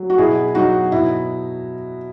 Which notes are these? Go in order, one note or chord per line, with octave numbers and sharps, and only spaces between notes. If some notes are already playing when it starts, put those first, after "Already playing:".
Already playing: F#3
F#4
B2 E4 G#4
F#3 D#4 F#4
B2 E4